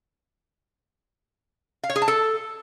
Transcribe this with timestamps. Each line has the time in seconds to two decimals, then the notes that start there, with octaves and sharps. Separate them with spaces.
1.83 F5
1.90 C#5
1.96 G#4
2.02 A5
2.08 A4